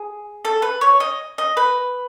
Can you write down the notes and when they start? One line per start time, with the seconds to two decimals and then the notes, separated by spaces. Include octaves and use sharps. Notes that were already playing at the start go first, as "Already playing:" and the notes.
Already playing: G#4
0.45 A4
0.62 B4
0.81 C#5
1.00 D#5
1.38 D#5
1.57 B4